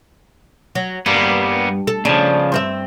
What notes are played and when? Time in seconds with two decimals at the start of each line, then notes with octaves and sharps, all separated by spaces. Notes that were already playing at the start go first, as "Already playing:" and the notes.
0.75 F#3
1.06 G2 G3 A#3 B3
1.87 A4
2.05 C#3 F3 D4
2.52 G2 C4 E5